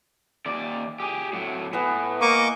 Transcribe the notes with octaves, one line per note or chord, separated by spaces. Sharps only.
D#2 D5
G4 G#4
A2 F#3
A2 E3 B3
A#3 D#5 C#6 D6